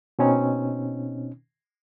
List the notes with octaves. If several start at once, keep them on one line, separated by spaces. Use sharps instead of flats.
B2 C4 C#4 D#4